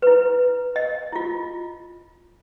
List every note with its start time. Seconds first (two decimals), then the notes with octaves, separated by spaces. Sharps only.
0.02 E4 B4
0.76 D#5
1.12 E4 F4